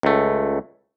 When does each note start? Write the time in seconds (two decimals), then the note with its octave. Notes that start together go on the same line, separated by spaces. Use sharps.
0.03 C#2 A3